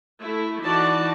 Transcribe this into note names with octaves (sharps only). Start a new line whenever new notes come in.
A3 E4
E3 D#4 F#4 D5 A5